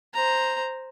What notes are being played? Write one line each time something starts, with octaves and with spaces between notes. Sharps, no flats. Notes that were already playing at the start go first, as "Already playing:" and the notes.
C5 A#5